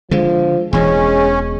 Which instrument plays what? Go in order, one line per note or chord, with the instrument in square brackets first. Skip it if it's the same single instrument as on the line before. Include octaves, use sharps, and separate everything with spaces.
[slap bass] D3 G#3 [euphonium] F3
[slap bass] E1 E2 B2 [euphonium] G#3 [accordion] C#4